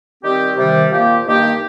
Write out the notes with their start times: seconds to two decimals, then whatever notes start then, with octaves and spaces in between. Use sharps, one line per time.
0.23 D#3 G3 C4 G4
0.57 C3 D#3 G3
0.91 A#2 F3 A#3 G4
1.25 G2 D#3 A#3 G4